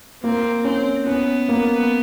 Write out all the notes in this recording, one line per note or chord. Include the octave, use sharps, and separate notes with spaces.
A#3 C4
C4 C#4
B3 C#4
A#3